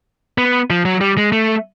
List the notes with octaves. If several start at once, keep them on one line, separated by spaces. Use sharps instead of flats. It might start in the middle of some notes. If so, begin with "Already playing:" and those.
B3
F3
F#3
G3
G#3
A3